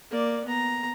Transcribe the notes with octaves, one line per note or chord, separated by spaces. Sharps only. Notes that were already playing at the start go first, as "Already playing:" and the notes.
A#3 D5
B3 A#5